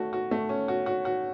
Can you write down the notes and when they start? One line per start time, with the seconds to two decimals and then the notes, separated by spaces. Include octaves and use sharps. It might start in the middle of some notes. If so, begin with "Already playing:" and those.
Already playing: A3 C#4 F#4
0.13 F#4
0.31 A3
0.49 C#4
0.68 F#4
0.86 F#4
1.05 F#4